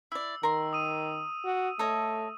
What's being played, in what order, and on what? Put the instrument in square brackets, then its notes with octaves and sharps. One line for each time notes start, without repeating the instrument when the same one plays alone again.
[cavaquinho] E4 D5 [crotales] E6
[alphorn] D#3 [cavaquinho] A#4 C6
[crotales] D#6 D#7
[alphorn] F#4
[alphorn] A3 [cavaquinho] A4 C#5 D#5